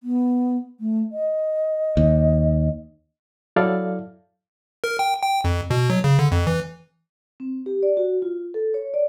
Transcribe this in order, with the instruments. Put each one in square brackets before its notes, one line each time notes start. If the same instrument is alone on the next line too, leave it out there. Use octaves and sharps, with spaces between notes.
[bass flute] B3
A3
D#5
[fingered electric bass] D#2
[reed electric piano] F#3 E4 A4 D5 F5
[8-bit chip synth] A#4
G5
G5
F2
B2
F#3
C#3
D3
F2
E3
[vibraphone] C4
G4
D5
F#4
F4
A4
C#5
D5